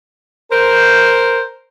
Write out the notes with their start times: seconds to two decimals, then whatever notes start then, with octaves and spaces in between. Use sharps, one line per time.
0.51 A#4 C5